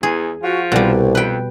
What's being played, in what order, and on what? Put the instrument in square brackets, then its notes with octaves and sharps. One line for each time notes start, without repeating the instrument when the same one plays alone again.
[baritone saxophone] E2 [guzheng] G#4
[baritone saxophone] F3 [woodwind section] F#4
[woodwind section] C2 [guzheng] B2 G3
[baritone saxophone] F2 [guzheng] B4 G5